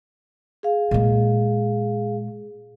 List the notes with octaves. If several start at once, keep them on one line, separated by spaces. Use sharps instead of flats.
G#4 F5
A#2 G#3